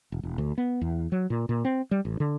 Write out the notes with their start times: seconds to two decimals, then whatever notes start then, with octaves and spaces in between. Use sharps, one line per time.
0.12 E1
0.23 E1
0.38 D2
0.58 B3
0.81 E2
1.12 F#3
1.30 A#2
1.49 A#2
1.65 C4
1.91 G3
2.05 A1
2.20 D3